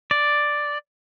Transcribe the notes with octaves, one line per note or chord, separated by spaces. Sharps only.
D5